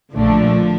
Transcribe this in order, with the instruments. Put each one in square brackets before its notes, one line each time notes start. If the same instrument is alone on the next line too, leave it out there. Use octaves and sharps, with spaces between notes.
[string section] A#1 A#2 A3 D4 [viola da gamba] D3 F3